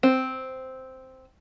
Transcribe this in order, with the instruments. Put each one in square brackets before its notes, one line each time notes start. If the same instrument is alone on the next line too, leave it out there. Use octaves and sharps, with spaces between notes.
[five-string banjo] C4